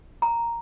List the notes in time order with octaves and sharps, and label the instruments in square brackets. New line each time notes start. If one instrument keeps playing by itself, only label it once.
[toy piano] A#5